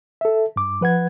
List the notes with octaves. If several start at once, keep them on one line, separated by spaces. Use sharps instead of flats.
A4 E5
G2 D6
F3 B4 F#5 G#6